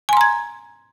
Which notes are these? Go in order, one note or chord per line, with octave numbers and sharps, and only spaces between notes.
G#5 A#5 C6 G#6